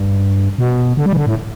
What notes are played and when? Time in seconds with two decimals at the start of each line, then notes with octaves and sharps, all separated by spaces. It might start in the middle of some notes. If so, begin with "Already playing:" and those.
Already playing: G2
0.58 B2
0.97 D3
1.06 G3
1.13 E3
1.17 D3
1.26 A2